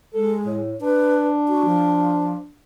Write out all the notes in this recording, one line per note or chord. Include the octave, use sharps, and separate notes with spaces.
G#3 A4
A2
D4 B4
F#4
F3